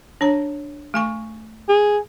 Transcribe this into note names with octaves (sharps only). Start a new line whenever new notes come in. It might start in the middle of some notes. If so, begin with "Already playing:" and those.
D4 C#5 A#5
A3 G#5 C#6
G#4